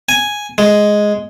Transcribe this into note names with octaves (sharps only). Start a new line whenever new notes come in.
G#5
G#3